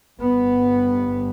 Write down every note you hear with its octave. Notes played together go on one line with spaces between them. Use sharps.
G1 G2 B3